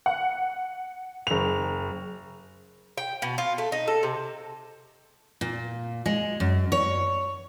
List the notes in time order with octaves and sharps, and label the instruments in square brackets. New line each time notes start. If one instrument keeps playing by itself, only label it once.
[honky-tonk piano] F#5
F#1 F7
[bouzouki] G5
B2
F4
A3
D#4
A4
C3
[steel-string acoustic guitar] A#2
G#3
F#2
C#5